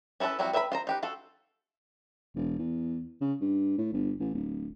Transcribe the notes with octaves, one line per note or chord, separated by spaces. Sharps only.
C#4 E4 G#4 A4 B4
F3 G3 C4 E4 F#4
B4 E5 G5 A#5 B5
F4 C5 A#5
D#4 G4 B4
F4 F#4 A4
E1
E2
C#3
G2
A2
G1
A1
D1